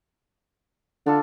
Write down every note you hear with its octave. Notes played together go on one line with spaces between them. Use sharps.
D3 D4 F4 A4